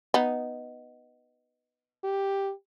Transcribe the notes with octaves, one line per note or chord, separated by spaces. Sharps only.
B3 D#4
G4